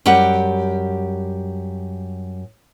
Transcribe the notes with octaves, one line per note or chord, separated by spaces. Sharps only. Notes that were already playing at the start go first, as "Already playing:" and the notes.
F#2 G3 G4 F#5